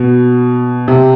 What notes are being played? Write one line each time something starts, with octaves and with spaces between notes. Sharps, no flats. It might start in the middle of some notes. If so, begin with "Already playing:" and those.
Already playing: B2
C3